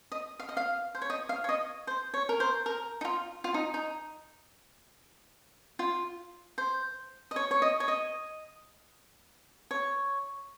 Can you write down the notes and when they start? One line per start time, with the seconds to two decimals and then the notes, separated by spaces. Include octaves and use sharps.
0.12 D#5
0.39 F5
0.49 D#5
0.57 F5
0.95 C5
1.02 C#5
1.10 D#5
1.29 F5
1.44 C#5
1.49 D#5
1.87 C5
2.14 C#5
2.29 A#4
2.40 C5
2.66 A#4
3.01 D#4
3.05 F4
3.44 F4
3.54 D#4
3.74 D#4
5.79 F4
6.58 C5
7.31 D#5
7.36 C#5
7.51 C#5
7.62 D#5
7.80 C#5
7.88 D#5
9.71 C#5